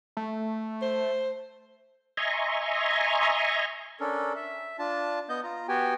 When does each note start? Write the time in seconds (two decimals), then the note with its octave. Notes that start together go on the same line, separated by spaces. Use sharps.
0.17 A3
0.82 C5
2.17 D#5 E5 G#5 A#5 C6 C#6
4.00 C#4 D4 A4 A#4
4.35 E5
4.79 D4 F4 A5
5.29 B3 D#5 G6
5.43 F4 A#5
5.68 B3 F#4 G4 G5 G#5